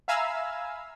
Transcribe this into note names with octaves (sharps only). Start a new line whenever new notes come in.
E5 F5 G#5 A#5 B5 E6